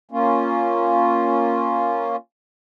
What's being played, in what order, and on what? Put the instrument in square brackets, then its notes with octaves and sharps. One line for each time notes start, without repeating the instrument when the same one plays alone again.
[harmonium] A#3 C#4 F4